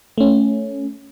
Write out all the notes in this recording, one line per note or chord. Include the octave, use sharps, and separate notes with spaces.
A3 C#4